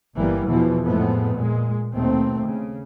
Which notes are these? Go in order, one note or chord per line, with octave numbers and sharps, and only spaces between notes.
G1 E3 G3 A#3 B3
E2 B2 E3 F3
F2 A2 F3 G#3 A3 B3
A#2 G#3
D#2 B2 A3 C4
C#3